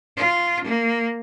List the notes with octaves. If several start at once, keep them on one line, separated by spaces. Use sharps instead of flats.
F4
A#3